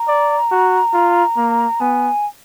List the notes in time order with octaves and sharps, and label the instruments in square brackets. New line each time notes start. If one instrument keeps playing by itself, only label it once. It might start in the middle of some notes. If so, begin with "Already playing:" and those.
Already playing: [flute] A#5
[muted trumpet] D5
F#4
F4
A#3
[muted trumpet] B3 [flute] G#5